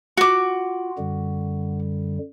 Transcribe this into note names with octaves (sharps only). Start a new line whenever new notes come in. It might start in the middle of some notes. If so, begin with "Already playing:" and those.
F4 F#4 D6
F#2 D3 G3